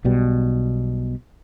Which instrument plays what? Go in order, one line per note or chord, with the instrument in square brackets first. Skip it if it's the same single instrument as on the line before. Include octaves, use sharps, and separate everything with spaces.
[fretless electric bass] B1 B2 G3